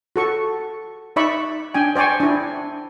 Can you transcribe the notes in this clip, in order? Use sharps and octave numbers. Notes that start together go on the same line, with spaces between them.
F#4 A4 C#6
D#4 D5 E5 B5 C#6
D4 G5 G#5
C5 D5 G5 G#5 C#6
D4 E4